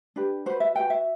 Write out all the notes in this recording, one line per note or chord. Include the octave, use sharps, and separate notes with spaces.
D4 G4 B4
F#4 B4 C5
E5
F#4 B4 G5
E5